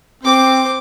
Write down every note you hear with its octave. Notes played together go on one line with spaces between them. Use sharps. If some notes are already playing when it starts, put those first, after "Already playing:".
C4 C5 D6